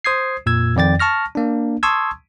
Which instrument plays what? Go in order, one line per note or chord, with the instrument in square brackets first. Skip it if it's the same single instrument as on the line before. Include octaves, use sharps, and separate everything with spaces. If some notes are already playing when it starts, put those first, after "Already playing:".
[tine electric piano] C5 D#6 G#6 C7
F2 A#2 E6 G#6
F2 D#3 D5 G5 A6
A5 C#6 F6 A#6
A#3 D4
A5 C6 C#6 D#6 E6 G#6